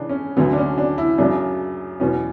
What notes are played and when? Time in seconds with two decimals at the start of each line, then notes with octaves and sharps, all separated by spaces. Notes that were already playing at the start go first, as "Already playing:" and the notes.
Already playing: C#3 E3 D4
0.09 C#4
0.37 D2 D3 F#3 B3
0.53 D4
0.57 C#4
0.78 D4
0.98 E4
1.18 F#2 C#3 F#3 D4
2.00 E2 B2 F#3 C#4